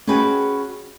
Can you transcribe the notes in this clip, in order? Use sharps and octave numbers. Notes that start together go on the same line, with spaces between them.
C#4 F#4 G#4 B4 D#5 G5